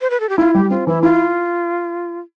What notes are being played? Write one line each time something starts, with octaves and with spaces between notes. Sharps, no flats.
C5
B4
A4
G4
E4 F4
G3 G4
C4 F4
E3 E4
E4 F4